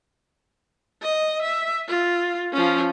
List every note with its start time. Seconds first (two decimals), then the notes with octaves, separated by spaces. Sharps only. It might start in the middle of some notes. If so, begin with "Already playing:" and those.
1.02 D#5
1.42 E5
1.88 F4
2.53 F3 C#4